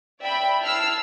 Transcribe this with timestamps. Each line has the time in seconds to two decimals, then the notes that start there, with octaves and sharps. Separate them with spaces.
0.22 D5 E5 G5 B5
0.62 E4 A5 E6 F6 C7